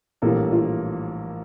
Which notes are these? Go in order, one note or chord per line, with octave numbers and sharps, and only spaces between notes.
A#1 A2 E3 G3 A#3 A4
F4